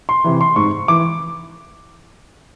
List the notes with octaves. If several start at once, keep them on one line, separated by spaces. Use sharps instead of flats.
C6
C3 E3
C6
G#2 C#6
E3 D6